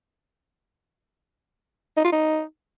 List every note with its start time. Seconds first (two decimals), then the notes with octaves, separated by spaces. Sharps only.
1.97 D#4
2.05 F4
2.12 D#4